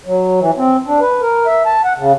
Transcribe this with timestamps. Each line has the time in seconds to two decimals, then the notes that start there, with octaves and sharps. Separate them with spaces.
0.06 F#3
0.41 E3
0.58 C4
0.87 D4
1.00 B4
1.21 A#4
1.46 E5
1.66 A5
1.84 F#5
1.98 C#3